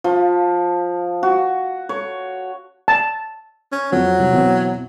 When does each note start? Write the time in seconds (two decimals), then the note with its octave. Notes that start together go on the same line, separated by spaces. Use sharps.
0.04 F3
1.23 F#4
1.89 C#5
2.88 A5
3.72 C#4
3.92 F2 F#3
4.19 C2
4.32 B2 E3 C4